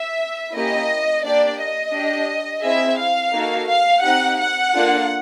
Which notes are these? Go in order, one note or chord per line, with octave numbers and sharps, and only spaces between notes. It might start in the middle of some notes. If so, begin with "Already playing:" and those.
Already playing: E5
A#3 C#4 E4 G4 D#5
A#3 D4 G4 D5
D#5
D4 G4
C4 E4 G#4 E5
F5
A#3 D#4 F#4 A4
F5
C4 D#4 G4 F#5
F#5
A#3 D4 F4 A4